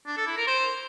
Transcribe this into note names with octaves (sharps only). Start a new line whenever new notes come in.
D4
A4
E4
A#4
C5